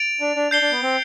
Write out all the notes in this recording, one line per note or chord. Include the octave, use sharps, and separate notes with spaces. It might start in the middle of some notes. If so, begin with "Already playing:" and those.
Already playing: A6 D7 F7
D4
D4
D4 G6 C7 G7
D4
B3
C4